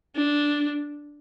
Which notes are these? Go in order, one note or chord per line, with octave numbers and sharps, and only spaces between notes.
D4